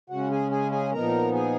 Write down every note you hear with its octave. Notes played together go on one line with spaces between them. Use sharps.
C#3 G#3 C#4 F#4 F#5
G#4 G#5
G#4 G#5
G#4 G#5
A#2 F3 B3 D#4 A#4 A#5
G#4 G#5